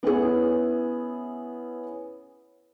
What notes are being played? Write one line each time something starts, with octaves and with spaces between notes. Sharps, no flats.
B3 C#4 E4 G#4